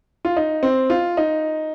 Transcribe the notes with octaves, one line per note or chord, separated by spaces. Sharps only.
F4
D#4
C4
F4
D#4